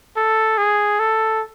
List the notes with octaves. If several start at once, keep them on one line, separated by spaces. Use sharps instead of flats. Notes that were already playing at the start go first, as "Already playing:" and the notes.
A4
G#4
A4